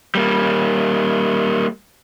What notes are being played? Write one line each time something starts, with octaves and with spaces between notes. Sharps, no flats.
G3 A#3